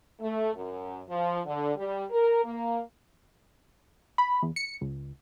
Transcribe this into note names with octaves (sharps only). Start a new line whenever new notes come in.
A3
F#2
F3
D3
G3
A#4
A#3
B5
E2
C#7
C#2